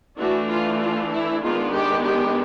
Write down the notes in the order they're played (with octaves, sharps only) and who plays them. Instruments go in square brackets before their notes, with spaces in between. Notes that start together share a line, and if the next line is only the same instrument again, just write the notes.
[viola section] E3 A3 D4 F#4
F4
F4
E4
D#3 G#3 B3 D4 F4
G4
G4